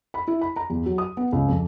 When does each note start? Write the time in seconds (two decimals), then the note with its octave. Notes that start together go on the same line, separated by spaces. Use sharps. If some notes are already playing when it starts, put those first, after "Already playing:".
0.14 B5
0.27 E4
0.41 B5
0.56 A#5
0.70 E2
0.86 F#3
0.98 D#6
1.17 B3
1.33 C#2
1.48 F2